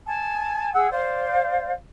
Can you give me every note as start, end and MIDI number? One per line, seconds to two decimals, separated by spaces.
0.07 0.70 80
0.07 0.70 81
0.74 0.90 68
0.74 0.90 78
0.74 0.90 88
0.91 1.71 72
0.91 1.71 74
0.91 1.71 77